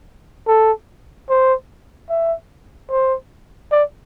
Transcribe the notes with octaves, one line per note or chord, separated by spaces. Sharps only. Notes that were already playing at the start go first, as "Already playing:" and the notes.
A4
C5
E5
C5
D5